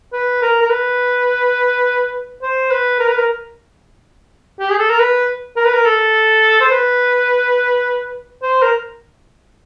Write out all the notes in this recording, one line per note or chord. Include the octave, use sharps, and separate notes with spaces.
B4
A#4
A#4
B4
C5
B4
A#4
B4
A#4
G4
G#4
A4
A#4
B4
A#4
B4
A#4
A4
C5
B4
C5
A#4